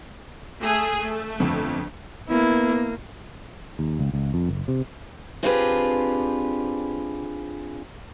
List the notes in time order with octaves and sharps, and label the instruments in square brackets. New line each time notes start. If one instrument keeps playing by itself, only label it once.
[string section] A3 G#4
A3
[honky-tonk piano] G1 F2
[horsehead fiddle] A#3 [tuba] B3 [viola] E4
[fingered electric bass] D#2
C#2
C#2
F2
F#1
C3
[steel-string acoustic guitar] C4 D4 F4 G4 G#4 B4